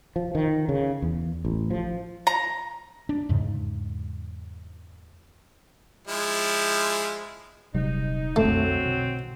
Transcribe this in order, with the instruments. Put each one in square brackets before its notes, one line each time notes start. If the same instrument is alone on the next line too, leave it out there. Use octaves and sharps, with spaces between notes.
[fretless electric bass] F3
D#3
C#3
E2
A1
F3
[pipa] A#5
[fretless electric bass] D4
E2 G#2 C#3
[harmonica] F3 G#3 E4
[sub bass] D#1 [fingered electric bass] C3 F#3 G3 [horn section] D#4
[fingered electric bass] B1 D3 [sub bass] F2 [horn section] F#3 C4 [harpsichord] A3
[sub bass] B2